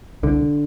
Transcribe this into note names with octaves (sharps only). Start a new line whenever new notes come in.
C2 D3